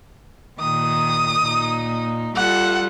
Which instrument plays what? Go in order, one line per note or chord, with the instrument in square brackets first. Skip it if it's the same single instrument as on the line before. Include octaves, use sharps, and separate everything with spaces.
[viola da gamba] A#2 D#3 [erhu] D#6
[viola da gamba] A#2 D#4
[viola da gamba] G3 F4 A4 [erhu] F#5